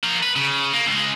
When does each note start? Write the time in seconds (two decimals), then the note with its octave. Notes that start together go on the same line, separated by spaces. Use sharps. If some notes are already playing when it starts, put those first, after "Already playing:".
0.03 F3 A#4
0.23 B4
0.36 C#3
0.74 A#3
0.87 C#2 G#3